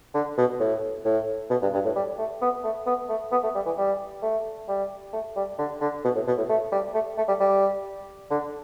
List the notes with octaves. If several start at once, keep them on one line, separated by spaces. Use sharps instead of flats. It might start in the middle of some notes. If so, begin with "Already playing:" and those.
D3
B2
A2
A2
B2
G2
G2
A2
G3
A3
B3
A3
B3
A3
B3
A3
G3
E3
G3
A3
G3
A3
G3
D3
D3
B2
A2
B2
A2
A3
G3
A3
A3
G3
G3
D3